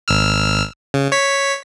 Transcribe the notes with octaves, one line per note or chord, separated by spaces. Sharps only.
G#1 E6 F6
C#3
C#5 B6